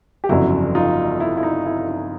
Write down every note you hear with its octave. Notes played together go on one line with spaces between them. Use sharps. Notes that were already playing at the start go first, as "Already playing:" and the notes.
G4
G1 F2 C#3 F#3 E4 F#4
D#4 F4
E4
E4
D#4
E4
D#4